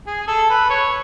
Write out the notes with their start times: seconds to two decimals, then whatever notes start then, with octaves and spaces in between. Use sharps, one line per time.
0.07 G#4
0.28 A4
0.50 B4
0.70 C#5